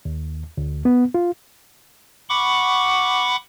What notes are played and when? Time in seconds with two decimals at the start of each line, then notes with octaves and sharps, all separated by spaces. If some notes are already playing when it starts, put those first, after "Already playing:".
0.05 D#2
0.58 D2
0.85 B3
1.14 F4
2.29 F#5 B5 C#6 D6